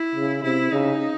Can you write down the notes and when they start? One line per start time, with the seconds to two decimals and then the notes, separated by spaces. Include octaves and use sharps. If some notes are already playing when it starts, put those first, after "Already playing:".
Already playing: E4
0.15 C#3
0.43 C3 E4
0.72 C#3 D#4